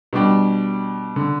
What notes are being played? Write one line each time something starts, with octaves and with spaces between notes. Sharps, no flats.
B2 G3 D4 G4
D3